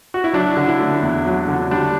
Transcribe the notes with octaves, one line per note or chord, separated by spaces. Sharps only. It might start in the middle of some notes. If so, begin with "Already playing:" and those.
F#4
E4
F#3 D4
D3
E4
A3
E2
F#3
D3
G3 D4